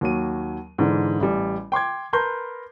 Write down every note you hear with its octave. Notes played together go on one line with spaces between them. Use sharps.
D#2 F#3 D#7
G#2 D3 E3
A1 G3
G5 C6 D6 G#6
A#4 B4 A5 A#5 C6 G6